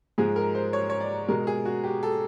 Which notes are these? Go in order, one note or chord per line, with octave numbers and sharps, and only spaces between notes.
G#2 F3 G#3 G#4
A#4
C5
C#5
C#5
D5
B2 G#3 A#4
G#4
F#4
G4
A4